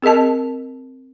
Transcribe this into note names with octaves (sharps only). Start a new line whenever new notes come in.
C4 G#4 A#4 D#5 A5